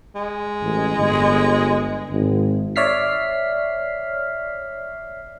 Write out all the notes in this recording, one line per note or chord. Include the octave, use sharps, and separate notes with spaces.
G#3
A1
G1
G#1
C#5 D5 E5 F6 B6 C7